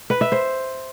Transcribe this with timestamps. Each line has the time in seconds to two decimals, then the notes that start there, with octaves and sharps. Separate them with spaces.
0.10 B4
0.21 E5
0.32 C5